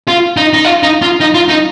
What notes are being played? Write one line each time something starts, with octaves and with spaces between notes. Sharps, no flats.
F4
D#4
D#4
F4
D#4
F4
D#4
F4
D#4